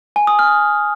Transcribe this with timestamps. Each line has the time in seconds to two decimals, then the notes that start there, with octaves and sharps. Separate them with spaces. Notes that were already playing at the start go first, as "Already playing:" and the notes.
0.16 G#5
0.27 D#6
0.39 F6